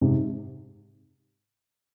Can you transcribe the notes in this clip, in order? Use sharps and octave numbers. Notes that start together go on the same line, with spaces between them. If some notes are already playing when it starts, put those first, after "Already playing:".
G#2 C3